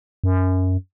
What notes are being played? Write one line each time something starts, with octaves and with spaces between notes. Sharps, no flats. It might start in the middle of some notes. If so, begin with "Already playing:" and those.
F#2